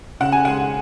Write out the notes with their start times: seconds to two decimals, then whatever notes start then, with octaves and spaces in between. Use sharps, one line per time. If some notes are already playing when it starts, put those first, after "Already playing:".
0.20 C#3 F#5
0.32 G#5
0.45 G#3 F#5